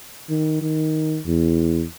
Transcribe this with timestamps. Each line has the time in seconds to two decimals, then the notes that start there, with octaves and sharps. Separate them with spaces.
0.29 D#3
0.61 D#3
1.26 E2